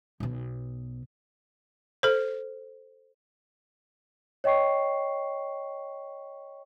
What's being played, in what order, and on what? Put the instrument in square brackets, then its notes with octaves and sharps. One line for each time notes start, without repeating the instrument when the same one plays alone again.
[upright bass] B1 B2
[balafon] A4 C5
[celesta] C#5 D#5 G5 C#6 C7